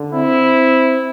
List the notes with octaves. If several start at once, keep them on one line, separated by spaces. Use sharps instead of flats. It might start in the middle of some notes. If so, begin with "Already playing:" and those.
Already playing: D3
C4 E4